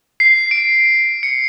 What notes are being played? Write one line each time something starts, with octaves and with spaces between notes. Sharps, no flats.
C7
D7
C#7